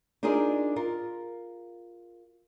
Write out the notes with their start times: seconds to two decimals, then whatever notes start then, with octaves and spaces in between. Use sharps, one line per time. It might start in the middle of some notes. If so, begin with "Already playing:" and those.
0.23 D4 D#4 F4 G#4 A#4 D5
0.76 F4 A#4